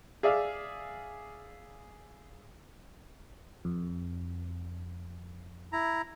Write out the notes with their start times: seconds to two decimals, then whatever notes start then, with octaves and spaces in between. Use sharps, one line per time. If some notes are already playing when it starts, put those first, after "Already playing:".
0.23 G#4 D5 E5 F5
3.65 F2
5.73 E4 A#5